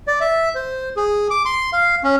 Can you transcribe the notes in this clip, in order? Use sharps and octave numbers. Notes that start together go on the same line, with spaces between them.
D5
E5
C5
G#4
D6
C6
F5
C#4